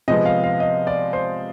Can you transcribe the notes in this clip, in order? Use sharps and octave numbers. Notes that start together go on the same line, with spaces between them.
C3 F3 G#3 B3 D#5
F5
F5
D#5
D5
C5